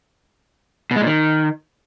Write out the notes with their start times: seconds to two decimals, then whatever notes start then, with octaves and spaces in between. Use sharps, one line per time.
0.91 B2
0.96 G#3
1.01 A#2
1.06 D#3